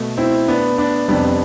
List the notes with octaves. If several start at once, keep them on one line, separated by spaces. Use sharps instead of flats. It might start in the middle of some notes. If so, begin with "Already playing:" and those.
Already playing: B2 A3
C4 E4
B3 D4
B3 D4
F2 C3 G3 B3 D4